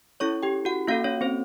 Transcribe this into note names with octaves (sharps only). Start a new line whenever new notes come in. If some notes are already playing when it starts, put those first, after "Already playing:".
C#4 E4 A4 C#5 C#6
G4 G5
F#4 F#5
A#3 C#4 F4 F#4 A4 F5
C#4 C#5
C4 C5